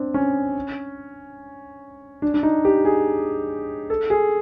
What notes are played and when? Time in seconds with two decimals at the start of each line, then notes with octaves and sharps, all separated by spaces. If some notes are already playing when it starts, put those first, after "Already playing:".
Already playing: C4 D4
0.14 C#4
2.22 D4
2.34 D4
2.43 D#4
2.65 G4
2.85 G#4
3.90 A4
4.10 G#4